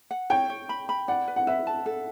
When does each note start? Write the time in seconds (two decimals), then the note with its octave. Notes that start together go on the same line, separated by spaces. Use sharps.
0.11 F#5
0.30 C#5 G5
0.50 C#5
0.69 B5
0.89 B5
1.08 D5 F#5
1.28 B4
1.36 F#5
1.47 B4 E5
1.67 A5
1.86 A4